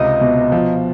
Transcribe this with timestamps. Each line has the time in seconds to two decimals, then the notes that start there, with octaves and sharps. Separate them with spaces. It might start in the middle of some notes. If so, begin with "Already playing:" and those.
Already playing: C#2 C3 D#4 D#5
0.21 B2
0.52 F3